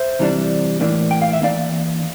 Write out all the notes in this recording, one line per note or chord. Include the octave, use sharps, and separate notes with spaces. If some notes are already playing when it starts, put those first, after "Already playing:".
Already playing: C5 E5
C3 E3 G3 D4
A2 E3 A#3 D4
G5
F5
E5
E3 A#3 D4 D5 F5